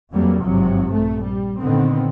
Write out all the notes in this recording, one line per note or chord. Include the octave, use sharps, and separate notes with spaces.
F2 E3 F#3 G3 A#3
G#1 G2 C3 F3 F#3
A#1 A3
G3
A#2 D3 D#3 B3 C4